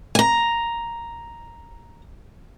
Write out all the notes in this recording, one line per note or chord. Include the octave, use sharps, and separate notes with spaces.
G#5 A#5